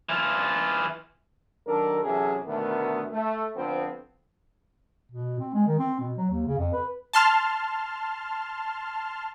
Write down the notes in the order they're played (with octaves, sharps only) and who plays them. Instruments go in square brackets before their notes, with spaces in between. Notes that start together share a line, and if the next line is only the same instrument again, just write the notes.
[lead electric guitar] E3 F4
[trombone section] D#3 F#3 D4 A4 A#4
C3 E3 F#3 C#4 G#4 A4
D2 B2 D#3 A3 B3 A#4
A3
D3 F3 B3 C4
[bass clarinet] B2
C4
G#3
D#3
C4
B2
F#3
D#2
C#3
F2
B4
[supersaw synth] A5 C6 F6